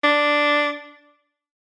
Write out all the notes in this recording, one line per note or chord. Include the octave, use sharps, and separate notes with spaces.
D4